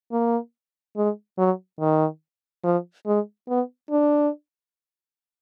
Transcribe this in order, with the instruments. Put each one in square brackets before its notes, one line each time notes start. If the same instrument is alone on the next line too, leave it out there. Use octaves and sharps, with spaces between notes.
[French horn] A#3
G#3
F#3
D#3
F3
G#3
B3
D4